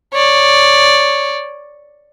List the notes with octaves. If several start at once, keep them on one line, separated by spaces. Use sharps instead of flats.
C#5 D5